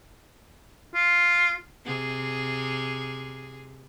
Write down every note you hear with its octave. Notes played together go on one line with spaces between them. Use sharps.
F4
C3 G#4